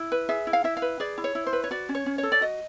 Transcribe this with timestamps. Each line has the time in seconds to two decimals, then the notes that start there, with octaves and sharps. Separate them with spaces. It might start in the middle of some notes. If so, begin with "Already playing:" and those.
Already playing: E4
0.12 B4
0.29 G#4 E5
0.47 E4
0.53 F5
0.64 E4 E5
0.77 F5
0.82 B4
1.00 G#4 D5
1.18 E4
1.24 C#5
1.35 E4
1.47 C5
1.53 B4
1.64 C#5
1.71 F#4 D5
1.89 C#4
1.95 C#5
2.06 C#4
2.18 C#5
2.23 A4
2.32 D5
2.41 F#4 D#5